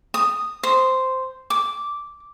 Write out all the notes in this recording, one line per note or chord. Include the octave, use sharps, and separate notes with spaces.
D#6
C5
D6